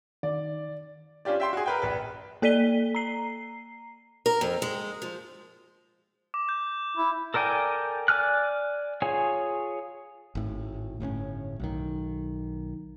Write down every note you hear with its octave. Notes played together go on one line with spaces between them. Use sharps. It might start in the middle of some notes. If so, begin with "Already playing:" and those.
D#3 D5
C#4 D4 F4 G4 D5
E5 G5 C6
F#4 G#4
A#4 B4 G5
A#1 B4
A#3 A4 D5 B6 D#7 G7
A#5 C7
A#4
F2
G#3
F3
D6
G6
E4
A4 A#4 D5 G5 G#5
D5 G#5 F6 F#6
F4 G#4 C#5 G#5
G#1 A2
G1 A2 C4 C#4
B1 D#3